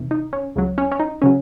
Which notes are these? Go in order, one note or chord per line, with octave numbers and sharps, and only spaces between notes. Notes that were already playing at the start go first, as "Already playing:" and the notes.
Already playing: E2 C3 D#3
D#4
C#4
C#2 C#3 F#3
C#4
C#4
D#4
C#3 F#3 C#4